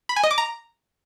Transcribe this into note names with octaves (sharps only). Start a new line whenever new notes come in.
B5
G#5
D#5
D6
A#5